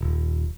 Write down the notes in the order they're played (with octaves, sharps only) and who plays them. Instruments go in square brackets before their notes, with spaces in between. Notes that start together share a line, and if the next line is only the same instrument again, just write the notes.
[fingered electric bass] D#1